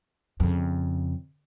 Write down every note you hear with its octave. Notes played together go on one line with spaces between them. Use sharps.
F2 C#3